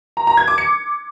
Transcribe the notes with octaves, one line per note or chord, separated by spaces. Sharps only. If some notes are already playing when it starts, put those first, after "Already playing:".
A#5
A#5
G#6
D6
C#7